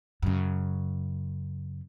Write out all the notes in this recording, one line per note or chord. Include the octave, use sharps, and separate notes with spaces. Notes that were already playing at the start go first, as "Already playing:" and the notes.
F#2 C#3